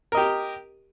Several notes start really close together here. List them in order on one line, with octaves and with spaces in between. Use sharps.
A#4 D#5 G4